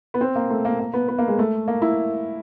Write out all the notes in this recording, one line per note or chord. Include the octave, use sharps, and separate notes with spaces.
B3
C4
A#3
A3
A#3
A#3
B3
B3
A#3
G#3
A3
A#3
E4